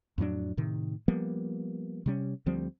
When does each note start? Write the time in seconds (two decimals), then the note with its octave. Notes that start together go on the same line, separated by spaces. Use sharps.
0.18 F2 A2 F#3 D4
0.57 A2 C3 D#3
1.08 F3 G3 A#3 B3
2.06 C3 G3 C#4
2.46 D2 F3 G3 C4